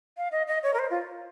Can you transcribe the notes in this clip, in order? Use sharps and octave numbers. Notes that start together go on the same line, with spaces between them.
F5
D#5
D#5
C#5
A#4
C5
F4